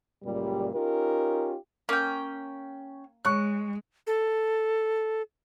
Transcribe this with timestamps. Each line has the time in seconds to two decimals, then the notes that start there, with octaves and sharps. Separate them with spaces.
0.23 C#2 F#2 A#2 G3
0.74 C#4 D#4 F4 G4 A#4
1.89 A#3 C#4 G5
3.25 G#3 C#5 C#6 F#6
4.07 A4